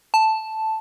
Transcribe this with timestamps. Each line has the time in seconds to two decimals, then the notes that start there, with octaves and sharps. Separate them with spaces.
0.14 A5